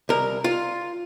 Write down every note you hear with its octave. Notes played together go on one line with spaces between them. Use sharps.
C2 A#4
F4